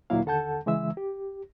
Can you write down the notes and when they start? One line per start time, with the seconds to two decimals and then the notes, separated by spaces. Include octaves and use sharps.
0.10 D2 A#2 F#3 A#3 E4 F5
0.25 D#2 D3 A4 F#5 A5 G6
0.66 C#3 E3 G#3 E5 E6
0.97 G4